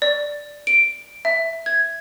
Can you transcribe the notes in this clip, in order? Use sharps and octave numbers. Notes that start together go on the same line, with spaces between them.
D5
D7
E5
G#6